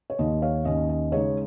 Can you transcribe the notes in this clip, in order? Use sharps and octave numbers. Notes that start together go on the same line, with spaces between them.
C#5
D#2 D#3 A#3 D#5
C#5 F5
D#2 D#3 C#4 D#5
D#5
C#3 G#3 D#4 C#5